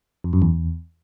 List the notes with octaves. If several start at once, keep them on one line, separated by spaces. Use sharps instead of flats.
F2
F#2
E2